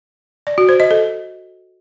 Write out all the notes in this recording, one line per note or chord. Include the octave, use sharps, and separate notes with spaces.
D5
F#4
C5
D#5
A4